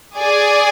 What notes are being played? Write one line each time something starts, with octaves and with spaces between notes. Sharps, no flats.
G#4 D5 G#5